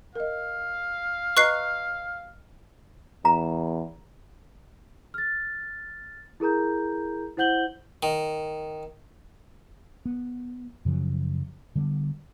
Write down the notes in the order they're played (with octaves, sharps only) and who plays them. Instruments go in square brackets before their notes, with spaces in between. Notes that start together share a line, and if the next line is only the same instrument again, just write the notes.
[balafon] A#4 D#5 [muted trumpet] F5
[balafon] B4 D#5 A#5 [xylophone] C#6 F#6 C7
[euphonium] E2 [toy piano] A#5
[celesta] F6 A6
E4 G#4 A#4 A#5 G6
E4 C5 F#5 G6 F#7 G7
[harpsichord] D#3
[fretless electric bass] B3
F#2 C#3 F3 F#3
D3 G3 A#3 B3